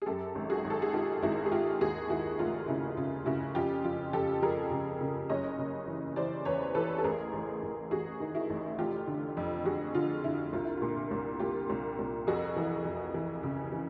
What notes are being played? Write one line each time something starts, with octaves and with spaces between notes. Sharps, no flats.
G#4
F#2 G4 A4
G#1
F#4 G#4
G#1
A4
G#4
D#3 F4 G4
G#1 E4 F#4
G#4
G#1 F4 G4
D#2 F#4 G#4
D#2 E4 F#4
F1 F4
C#3 E4
C#3 F4
C#3 E4 F#4
F2 F4 G4
F2 F4
F2 G4 A4
F2 G#4 A#4
C#3
C#3
F#1 C#5 D#5
C#3
E3
E3 C5 D5
E2 B4 C#5
E3 A4 B4
A4
A1 G#4 A#4
A1
A1
A1 F#4 G#4
D#3
E4 F#4
A1
F1 F4 G4
D3
F2
F2 F#4 G#4
D3 F4
D3 E4
C2 F4
E4
A#2 F4
C2
C2 F4 G4
C2
C2
F2 F#4 G#4
E3
F2
E3
C#3
E3